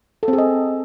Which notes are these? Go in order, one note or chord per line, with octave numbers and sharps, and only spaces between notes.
A4
C4
G#4
D#5